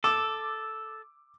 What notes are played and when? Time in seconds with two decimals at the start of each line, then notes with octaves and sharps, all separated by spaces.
0.04 A4 D6 E6